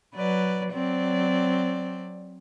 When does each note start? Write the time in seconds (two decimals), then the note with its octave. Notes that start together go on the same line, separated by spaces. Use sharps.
0.15 F#3 B4 D5
0.72 F#3 C4 D5